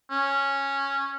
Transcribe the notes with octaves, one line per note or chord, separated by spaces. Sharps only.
C#4